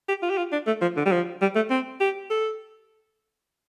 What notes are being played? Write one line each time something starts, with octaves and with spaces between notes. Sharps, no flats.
G4
F4
G4
F4
D4
A3
F3
D3
G3
F3
G3
A3
C4
G4
A4